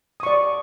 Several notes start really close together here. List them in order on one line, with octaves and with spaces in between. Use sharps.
D#6 C#6 D5